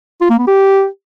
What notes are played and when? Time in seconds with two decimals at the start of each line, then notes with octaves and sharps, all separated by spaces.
0.21 F4
0.30 A#3
0.38 B3
0.47 G4